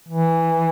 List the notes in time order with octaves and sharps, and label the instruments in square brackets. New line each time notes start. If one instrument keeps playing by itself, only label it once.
[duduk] E3